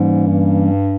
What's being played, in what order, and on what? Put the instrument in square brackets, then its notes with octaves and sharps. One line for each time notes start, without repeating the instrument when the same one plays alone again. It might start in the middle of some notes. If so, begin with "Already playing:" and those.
Already playing: [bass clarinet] G#2 [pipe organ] E3 G3 A#3 C#4
[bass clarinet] G2